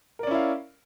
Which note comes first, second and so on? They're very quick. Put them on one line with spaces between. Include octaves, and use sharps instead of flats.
A#4 D5 C#4 E4 F5